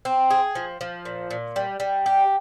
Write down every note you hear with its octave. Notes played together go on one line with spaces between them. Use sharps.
C4
G#4
F3
F3
A#2
A#2
G3
G3
G4